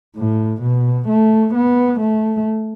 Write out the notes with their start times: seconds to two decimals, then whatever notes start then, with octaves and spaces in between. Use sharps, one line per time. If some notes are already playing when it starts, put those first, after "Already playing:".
0.16 A2
0.62 B2
1.08 A3
1.54 B3
2.00 A3